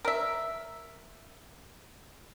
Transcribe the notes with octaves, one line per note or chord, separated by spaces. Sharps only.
A#4 E5